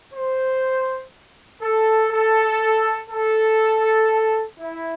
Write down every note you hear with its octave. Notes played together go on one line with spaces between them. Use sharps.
C5
A4
A4
A4
E4